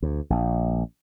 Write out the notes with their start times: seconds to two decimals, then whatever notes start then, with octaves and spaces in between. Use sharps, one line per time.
0.02 D2
0.30 A#1